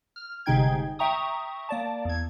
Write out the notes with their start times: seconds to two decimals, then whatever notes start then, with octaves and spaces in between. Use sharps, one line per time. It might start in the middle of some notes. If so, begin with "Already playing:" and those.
0.16 F6
0.46 G1 C3 G#3 D#4 G5 G#6
0.99 E5 G5 A#5 C#6 D#6
1.69 A#3 D5 A5
2.05 E2 G#6